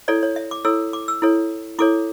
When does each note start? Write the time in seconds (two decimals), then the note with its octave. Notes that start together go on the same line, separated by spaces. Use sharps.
0.08 E4 A4 C#5 D5
0.23 C#5
0.36 E5
0.51 D6
0.65 E4 A4 C#5 E6
0.93 D6
1.08 E6
1.22 E4 A4 C#5
1.79 E4 A4 C#5 D6